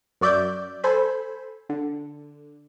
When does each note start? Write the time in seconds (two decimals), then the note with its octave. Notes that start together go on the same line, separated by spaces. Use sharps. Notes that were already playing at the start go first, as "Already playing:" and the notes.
0.21 F#2 F#4 D5 E5 G6 D7
0.84 A4 C5 G#5 B5
1.69 D3